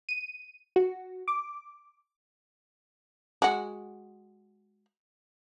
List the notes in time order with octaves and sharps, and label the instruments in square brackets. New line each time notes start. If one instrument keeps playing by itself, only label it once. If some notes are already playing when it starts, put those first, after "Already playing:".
[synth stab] D#7
F#4
D6
[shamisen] G#3 F#4